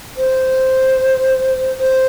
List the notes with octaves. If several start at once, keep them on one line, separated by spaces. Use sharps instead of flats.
C5
C5